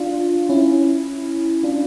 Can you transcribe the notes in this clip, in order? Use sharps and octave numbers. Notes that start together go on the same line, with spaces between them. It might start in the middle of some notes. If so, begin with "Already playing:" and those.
Already playing: D4 F4
C#4 E4
D4 F4